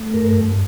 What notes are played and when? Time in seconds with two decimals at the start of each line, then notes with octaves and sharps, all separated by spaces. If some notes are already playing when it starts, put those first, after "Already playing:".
Already playing: A3
0.14 G2 A#4
0.36 G2